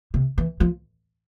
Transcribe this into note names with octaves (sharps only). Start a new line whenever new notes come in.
C3
E3
F3